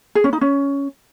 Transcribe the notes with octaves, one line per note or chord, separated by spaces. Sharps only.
G#4
C#4
D#4
C#4